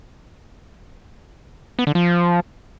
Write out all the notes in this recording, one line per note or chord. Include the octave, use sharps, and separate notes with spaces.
B3
D3
F3